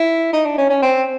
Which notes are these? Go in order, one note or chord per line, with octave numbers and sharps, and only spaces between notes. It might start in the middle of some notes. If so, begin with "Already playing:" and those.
Already playing: E4
D#4
D4
C#4
C#4
C4